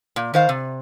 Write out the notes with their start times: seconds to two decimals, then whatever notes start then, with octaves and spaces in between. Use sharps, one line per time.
0.16 A#2
0.34 D#3 C5 F5
0.49 C3